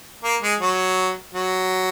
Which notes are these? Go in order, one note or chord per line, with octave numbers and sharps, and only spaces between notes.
A#3
G#3
F#3
F#3